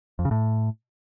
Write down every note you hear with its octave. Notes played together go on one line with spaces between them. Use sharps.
F2
C#3
A2